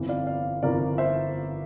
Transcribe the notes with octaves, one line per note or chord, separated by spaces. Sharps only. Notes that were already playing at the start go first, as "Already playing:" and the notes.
Already playing: G1 F2 E3
D5 F5
D5 F5
G1 F2 E3 A#4 D5
C5 E5